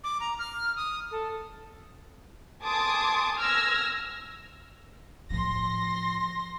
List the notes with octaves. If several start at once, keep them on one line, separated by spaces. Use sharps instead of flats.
D6
A#5
F6
D#6
A4
G#5 A5 C6 D6 D#6
E6 F6 G#6 A#6
A2 F3 C6 A#6